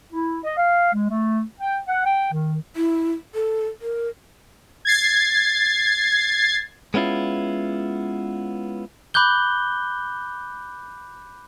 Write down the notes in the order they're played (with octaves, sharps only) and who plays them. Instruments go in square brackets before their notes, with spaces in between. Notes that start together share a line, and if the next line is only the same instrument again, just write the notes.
[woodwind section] E4
D#5
F5
G#3
A3
G5
F#5
G5
D#3
[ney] E4
A4
A#4
[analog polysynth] G#6 A6 C7
[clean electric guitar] G#3 B3 C#4 E4 F4
[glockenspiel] B5 D6 F#6 G6 G7